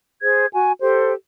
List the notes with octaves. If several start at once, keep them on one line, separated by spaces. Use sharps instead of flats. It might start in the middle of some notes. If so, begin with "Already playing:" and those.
G#4 C5 G#6
F#4 G#5
G4 A4 C5